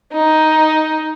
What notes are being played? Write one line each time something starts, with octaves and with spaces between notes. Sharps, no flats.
D#4